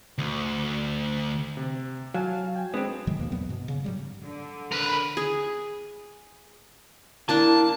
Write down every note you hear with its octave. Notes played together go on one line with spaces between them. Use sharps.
D2
C3
F#3 F5 G#5 A5
G5 G#5
G#3 B3 C4 D4 G#4
G#2 D#3 F#3 G#3
D#2 B2 A#3
E2 F#3 B3
G2 B2
C#3
G#2 F#3 G3
D3
A#4 B4
G#4
A#3 D4 E4 A5